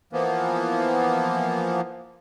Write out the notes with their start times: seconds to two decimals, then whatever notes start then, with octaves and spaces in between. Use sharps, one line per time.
0.13 E3 F3 A#3 B3